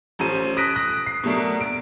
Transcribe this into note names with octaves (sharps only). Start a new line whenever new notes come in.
A1 F3 C#4 A4 C5 D#7
D#6 F#6 A#6 B6 D7
D#6 F#6 A#6
C7
B2 F#3 A3 D4 A#4
D7